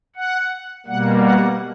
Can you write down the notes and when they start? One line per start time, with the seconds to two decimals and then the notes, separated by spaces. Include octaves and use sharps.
0.15 F#5
0.86 B2 G3 A#3 F#5
1.22 F#5